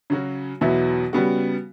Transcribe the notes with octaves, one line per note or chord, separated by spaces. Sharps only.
C#3 F#3 C#4 F#4
E2 B2 F#3 B3 E4
C#3 G3 B3 F#4